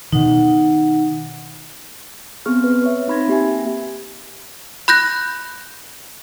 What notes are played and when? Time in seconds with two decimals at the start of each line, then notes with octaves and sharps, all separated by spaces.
0.12 B2 D#3 D#4 F#5
2.46 B3 C4 G#4 C#6 F6
2.64 B4
2.82 B4 C#5 E5
3.08 C4 D#4 B5 C6 G#6 A#6
3.28 A#3 G4 E5 G#5
4.88 B5 F#6 G6 A#6